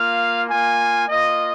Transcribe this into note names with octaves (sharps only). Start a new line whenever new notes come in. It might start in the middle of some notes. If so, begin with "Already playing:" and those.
Already playing: A#3 F4 F5
A#3 F4 G#5
A#3 F4 D#5